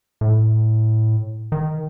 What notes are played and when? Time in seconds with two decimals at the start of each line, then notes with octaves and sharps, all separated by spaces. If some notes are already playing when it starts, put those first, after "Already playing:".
0.21 A2
1.52 D#3